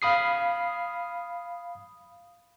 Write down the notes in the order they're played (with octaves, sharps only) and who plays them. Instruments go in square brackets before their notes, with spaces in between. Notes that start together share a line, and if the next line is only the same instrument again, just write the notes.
[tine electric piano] F5 B5 D#6 C7